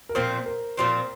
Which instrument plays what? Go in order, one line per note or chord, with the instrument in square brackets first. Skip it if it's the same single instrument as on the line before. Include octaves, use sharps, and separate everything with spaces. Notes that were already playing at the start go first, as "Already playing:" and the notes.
[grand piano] A#4
[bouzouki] A#2 F3 C4 [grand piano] C5
[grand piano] A#4
[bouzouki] A#2 F3 C4 [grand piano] C5